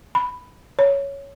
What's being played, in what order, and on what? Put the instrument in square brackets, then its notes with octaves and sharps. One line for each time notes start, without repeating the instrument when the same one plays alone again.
[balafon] B5
C#5